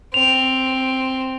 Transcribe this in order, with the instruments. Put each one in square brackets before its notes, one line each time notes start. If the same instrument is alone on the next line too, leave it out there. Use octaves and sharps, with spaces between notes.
[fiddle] C4 [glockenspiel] F7